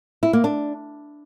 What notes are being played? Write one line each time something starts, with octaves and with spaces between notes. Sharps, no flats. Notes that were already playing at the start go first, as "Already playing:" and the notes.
E4
A#3
D4